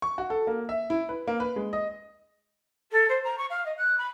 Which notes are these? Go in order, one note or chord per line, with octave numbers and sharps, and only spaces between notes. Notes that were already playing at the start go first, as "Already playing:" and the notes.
C#6
F#4
A4
A#3
E5
E4
B4
A#3
B4
G#3
D#5
A4
C5
A#5
C#6
F5
D#5
F#6
B5